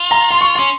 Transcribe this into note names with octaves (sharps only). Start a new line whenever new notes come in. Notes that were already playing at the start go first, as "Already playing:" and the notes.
Already playing: F4
A#5
C6
C#6
C#4 C6